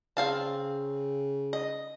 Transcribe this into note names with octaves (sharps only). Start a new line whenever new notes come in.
C#3 C4 F5 A5
D#5